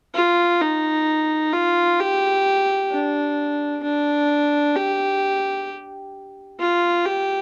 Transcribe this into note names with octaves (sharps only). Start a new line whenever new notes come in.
F4
D#4
F4
G4
D4
D4
G4
F4
G4